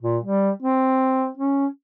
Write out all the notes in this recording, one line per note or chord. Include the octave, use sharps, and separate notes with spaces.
A#2
G3
C4
C#4